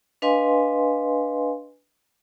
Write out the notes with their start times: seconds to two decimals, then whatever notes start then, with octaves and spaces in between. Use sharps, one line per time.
0.22 D4 B4 D#5 F5 G#5 C6